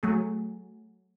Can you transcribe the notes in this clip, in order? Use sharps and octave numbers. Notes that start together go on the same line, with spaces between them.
F#3 A3 G#4